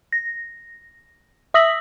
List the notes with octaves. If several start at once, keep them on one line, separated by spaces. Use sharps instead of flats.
A#6
E5 D#6 E6 A#6 B6 F#7